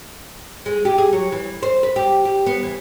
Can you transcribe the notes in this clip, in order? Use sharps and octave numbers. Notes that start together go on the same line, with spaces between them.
G#3
G4
G#4
F#3
E3
C5
B4
G4
G4
B3
E3